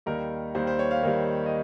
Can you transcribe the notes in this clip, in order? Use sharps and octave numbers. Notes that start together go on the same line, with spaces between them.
D#2 D#3 G3 A#4
D#2 D#3 G3 C5
C5
C#5
F5
D#2 D#3 G3
D#5